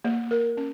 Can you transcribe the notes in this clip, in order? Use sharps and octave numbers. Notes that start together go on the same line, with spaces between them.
A#3
A#4
C#4